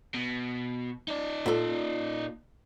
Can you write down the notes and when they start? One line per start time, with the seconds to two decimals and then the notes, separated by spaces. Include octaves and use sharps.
0.15 B2
1.08 D#4 D5
1.46 A#2 A4